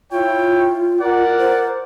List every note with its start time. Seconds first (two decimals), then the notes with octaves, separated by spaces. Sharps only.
0.12 E4 F4 C#5 G5
1.00 A#4 D5 F#5
1.38 C5